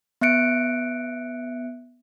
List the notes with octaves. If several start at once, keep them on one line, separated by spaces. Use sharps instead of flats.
B3 E5 F#6 C#7 D7